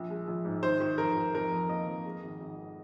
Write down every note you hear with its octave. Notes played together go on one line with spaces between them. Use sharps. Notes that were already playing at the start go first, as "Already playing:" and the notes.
Already playing: A#1
G#3
A#1
G#2
D#3 C5
D#3
F1 A#4
D#3
F2 A#4
F2
A#3 D#5
F2
G#3
G#1
G#1